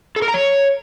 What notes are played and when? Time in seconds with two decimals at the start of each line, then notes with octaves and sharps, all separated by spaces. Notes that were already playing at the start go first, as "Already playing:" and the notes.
0.16 A4
0.22 A#4
0.28 A#5
0.34 C#5